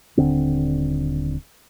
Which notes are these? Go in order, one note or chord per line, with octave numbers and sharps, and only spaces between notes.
D#1 D3 C4